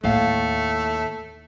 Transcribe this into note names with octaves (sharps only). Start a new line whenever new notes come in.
D#2 A2 A3 F5